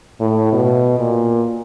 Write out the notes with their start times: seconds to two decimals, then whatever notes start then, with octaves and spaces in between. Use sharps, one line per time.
0.20 A2
0.52 B2
1.00 A#2